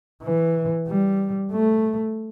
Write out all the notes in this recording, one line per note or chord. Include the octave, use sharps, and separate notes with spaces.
E3
G3
A3